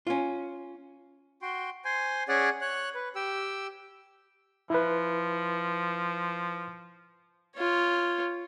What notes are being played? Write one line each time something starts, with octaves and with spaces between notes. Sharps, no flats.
C#4 F4
F#4 G5 C6
C5 G#5 C6
C#4 G#4 C#5 D5 F#5 G#5
C#5 F#6
B4
G4 G5 E6
F3 E4 B4
F4 C#5